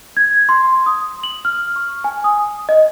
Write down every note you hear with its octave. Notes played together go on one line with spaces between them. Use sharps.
G#6
C6
D#6
F#7
F6
C#6
G#5
D#6
D#5